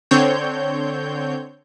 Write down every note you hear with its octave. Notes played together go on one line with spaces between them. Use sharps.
D3 C4 C#5 G6